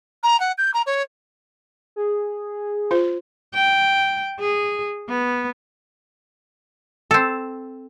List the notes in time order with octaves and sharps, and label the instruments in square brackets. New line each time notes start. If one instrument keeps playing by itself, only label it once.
[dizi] A#5
F#5
G6
A#5
C#5
[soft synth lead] G#4
[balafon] F4 C5
[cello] G5
G#4
B3
[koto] C4 A4